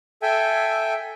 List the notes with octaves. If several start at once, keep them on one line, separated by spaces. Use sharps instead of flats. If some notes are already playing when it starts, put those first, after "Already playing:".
A4 E5 G5 G#5